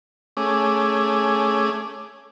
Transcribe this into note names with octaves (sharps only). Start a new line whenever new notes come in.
A3 C#4 G#4 D6